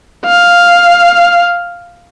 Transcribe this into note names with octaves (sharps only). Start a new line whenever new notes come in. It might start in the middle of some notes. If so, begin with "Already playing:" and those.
F5